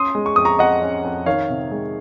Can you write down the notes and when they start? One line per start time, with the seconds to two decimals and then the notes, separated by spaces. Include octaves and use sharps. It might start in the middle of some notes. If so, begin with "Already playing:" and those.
Already playing: C#4 C6 D#6
0.15 G#3
0.26 C#6
0.36 F2 D#6
0.45 A#5 C#6
0.59 F2 D#5 F#5
0.82 C#4
1.04 F2
1.26 D#3 C#5 F5
1.49 C3
1.71 G#3